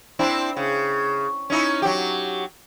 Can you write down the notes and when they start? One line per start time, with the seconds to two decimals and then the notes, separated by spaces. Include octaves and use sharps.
0.19 C4 D4 E4
0.57 C#3
1.50 C#4 D#4 E4
1.82 F#3 G4